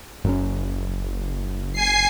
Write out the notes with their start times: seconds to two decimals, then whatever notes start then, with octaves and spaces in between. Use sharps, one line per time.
0.24 F#1 F#2 F#3 C#4
1.73 G#5 C7